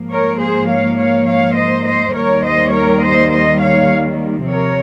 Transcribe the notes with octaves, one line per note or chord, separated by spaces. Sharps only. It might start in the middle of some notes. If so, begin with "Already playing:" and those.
Already playing: G#2 F3 A#3
A#4 C#5
G#4 C5
C#5 F5
C#5 F5
C#5 F5
C5 D#5
C5 D#5
D#2 D#3 G3 A#3 A#4 C#5
C5 D#5
A#4 C#5
C5 D#5
C5 D#5
C#5 F5
C3 F3 C4 A#4 C#5